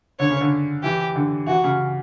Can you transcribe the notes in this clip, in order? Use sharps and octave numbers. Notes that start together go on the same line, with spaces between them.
D3 C#5
C#3
D3
E3 G4
D3
E3 F#4
C#3